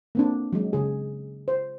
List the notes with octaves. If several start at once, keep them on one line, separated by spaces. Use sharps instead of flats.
A#3 C4 D4
F#3 G#3
C#3 G#4
C5